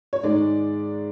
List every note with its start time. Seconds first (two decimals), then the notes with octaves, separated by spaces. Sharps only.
0.13 C#5
0.23 G#2 D#3 G#3 D5